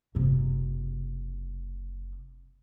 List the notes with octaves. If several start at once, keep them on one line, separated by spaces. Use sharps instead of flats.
F#1 C3